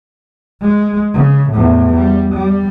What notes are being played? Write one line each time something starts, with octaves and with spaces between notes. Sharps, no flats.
G#3
C#3
E2 A2
G3
G3